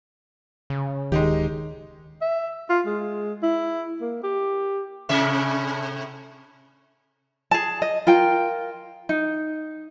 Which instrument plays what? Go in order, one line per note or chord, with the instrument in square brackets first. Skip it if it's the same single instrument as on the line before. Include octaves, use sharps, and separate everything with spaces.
[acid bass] C#3
[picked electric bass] D1 D#3 [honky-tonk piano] G#3 D#4 G4
[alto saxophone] E5
F4
G#3
E4
A#3
G4
[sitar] A2 C3 E5
[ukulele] G#4 A5
D#5
F4 A#4 G5
D#4